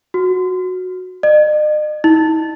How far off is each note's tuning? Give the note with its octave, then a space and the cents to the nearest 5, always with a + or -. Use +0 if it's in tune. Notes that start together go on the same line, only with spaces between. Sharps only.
F#4 -10
D#5 -45
D#4 +45